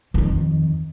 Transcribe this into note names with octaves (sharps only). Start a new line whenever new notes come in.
F2 D#3